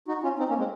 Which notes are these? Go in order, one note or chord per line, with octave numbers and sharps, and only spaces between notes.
D#4 F#4
C#4 F4
C4 D#4
A#3 C#4
G#3 C4